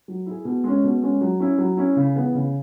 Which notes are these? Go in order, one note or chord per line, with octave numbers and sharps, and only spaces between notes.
F#3
E4 G#4
B2
G#3 C#4
B2
G#3 C#4
F#3
C#4 E4
F#3
C#4 E4
C#3
E3 B3 G#4
C#3